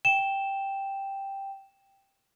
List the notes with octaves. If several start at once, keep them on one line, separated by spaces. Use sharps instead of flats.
G5 E7